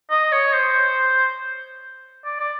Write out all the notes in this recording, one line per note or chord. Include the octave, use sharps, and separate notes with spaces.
D#5
C#5
C5
D5
D5